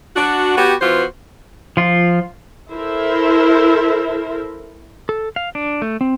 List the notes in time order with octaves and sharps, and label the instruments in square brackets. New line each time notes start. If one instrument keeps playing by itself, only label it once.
[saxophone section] D4 F#4
B3 F#4 G4
E3 B3 F4 F#4 C5
[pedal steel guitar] F3 F4
[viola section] E4 A4 A#4 C5 E5
[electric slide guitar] A4
F5
D4
A3
C4